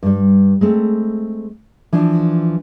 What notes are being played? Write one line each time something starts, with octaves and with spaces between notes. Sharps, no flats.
G2 G3
G#3 A3 C4
E3 F3 D4